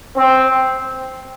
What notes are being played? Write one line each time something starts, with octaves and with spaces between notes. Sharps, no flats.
C4